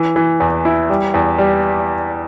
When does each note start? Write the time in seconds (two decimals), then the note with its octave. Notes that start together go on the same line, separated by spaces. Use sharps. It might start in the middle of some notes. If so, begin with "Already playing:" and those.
Already playing: E3
0.16 E3
0.40 E2
0.65 E4
0.90 G3
1.14 E2
1.38 G3